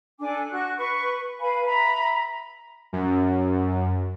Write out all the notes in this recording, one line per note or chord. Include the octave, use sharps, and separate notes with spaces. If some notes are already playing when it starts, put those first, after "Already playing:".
D4 A4 G#5 D6
F#4 C#6 F#6
B4 C#6
B4 F5 G#5 B5
E5 A#5 B5
F#2